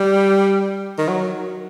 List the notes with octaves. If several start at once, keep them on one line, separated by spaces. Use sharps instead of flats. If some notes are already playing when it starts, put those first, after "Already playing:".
Already playing: G3
D#3
F#3